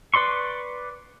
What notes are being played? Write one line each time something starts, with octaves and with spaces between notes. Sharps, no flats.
B4 D5 C6 C#6